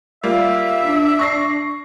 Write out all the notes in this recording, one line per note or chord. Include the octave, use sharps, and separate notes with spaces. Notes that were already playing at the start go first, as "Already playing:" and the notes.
G3 A#3 F4 E5
D4
C#6 A#6 C7